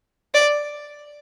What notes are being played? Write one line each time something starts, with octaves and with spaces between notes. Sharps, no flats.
D5